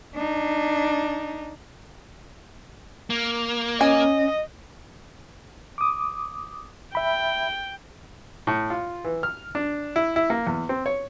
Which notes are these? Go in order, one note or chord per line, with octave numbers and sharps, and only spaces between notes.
D4 D#4
A#3
C#4 D#5 G#5
D6 D#6
E5 G5 B5
A2
F4
E3
F6
D4
E4
E4
A#3
E2
C4
C#5